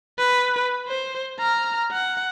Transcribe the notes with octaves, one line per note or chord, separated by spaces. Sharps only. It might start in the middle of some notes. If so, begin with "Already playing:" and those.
B4
C5
A#5 F6
F#5